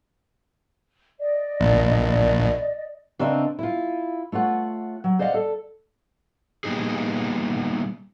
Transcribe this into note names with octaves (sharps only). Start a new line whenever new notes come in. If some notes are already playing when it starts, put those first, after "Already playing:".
D5 D#5
A#1
C#3 C4 D4 A#4 D#5 E5
E4 F4
A3 F4 C#5 F#5
F#3
C5 D5 D#5 F5 F#5
A4
G3 A#3 B3 D#4 G#4